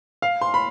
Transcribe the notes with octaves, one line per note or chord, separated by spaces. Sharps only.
F5
C6
B5